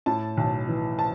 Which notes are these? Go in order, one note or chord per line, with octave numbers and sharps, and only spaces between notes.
A2 A5
B1
E3
A5